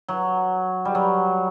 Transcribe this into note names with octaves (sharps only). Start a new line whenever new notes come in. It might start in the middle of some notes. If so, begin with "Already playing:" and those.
F#3
G3
F#3